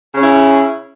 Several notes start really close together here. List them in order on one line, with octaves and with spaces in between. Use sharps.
C#3 C#4 E4